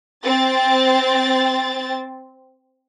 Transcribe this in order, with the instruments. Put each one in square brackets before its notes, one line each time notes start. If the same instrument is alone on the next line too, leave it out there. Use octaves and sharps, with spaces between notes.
[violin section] C4 A6